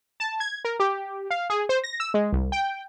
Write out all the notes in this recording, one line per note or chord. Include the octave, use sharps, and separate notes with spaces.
A5
G#6
A#4
G4
F5
G#4
C5
A#6
E6
G#3
C2
G5